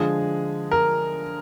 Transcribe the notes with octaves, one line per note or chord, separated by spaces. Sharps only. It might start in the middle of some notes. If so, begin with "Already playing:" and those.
Already playing: D3 F3 G#3 G#4
A#4